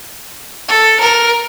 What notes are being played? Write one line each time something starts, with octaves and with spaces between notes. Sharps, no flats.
A4
A#4